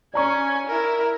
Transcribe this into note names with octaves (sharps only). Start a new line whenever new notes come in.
C#4 D5 G#5 A#5 C#6
E4 A#4